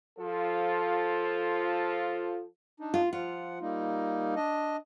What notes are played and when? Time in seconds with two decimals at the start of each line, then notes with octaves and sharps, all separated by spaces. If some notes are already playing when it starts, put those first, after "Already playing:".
0.18 F3 F4 A4
2.80 D4 D#4
2.94 F4
3.13 F3 F4 F#5
3.61 G3 A#3 D#4
4.36 D4 D#5